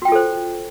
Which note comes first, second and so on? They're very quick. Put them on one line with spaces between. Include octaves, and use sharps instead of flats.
F#4 G5 F4 A4 C5